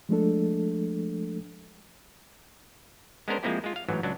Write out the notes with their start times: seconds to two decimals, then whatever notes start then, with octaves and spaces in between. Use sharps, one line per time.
0.09 F3 G#3 A3 D4 A4
3.28 G#3 B3 C#4 D4 A#4 C5
3.43 F3 G#3 A#3 C4 E4 G4
3.64 G#3 F4
3.76 F5
3.88 A1 G#2 E3 F#3
4.03 C#2 F#3 D4